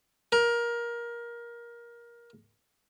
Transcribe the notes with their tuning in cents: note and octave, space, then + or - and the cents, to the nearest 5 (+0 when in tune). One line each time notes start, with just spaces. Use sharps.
A#4 +20